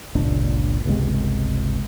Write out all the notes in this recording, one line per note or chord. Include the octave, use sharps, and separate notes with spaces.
G1 C#2 A#2 D4
G1 C#2 C3 G#3